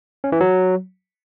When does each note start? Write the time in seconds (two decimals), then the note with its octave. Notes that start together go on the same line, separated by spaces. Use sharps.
0.24 C#4
0.32 E3
0.41 F#3